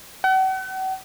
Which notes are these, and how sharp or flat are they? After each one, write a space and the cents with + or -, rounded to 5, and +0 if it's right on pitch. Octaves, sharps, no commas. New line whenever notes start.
F#5 +40